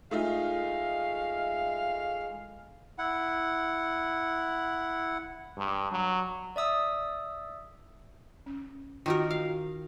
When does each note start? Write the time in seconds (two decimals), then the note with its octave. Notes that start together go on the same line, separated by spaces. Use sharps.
0.11 G#3 A3 D#4 F4 F5
2.99 E4 F#5
5.58 G2
5.92 F#3
6.56 D5 E5 D#6 E6
8.46 C#4
9.06 D#3 D#4 F4 F#4 A#4
9.31 F5